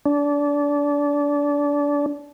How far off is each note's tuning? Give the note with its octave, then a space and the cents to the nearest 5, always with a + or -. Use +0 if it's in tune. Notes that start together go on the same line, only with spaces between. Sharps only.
D4 -25